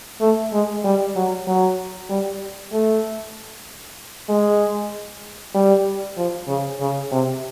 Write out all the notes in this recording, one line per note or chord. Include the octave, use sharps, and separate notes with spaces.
A3
G#3
G3
F#3
F#3
G3
A3
G#3
G3
F3
C#3
C#3
C3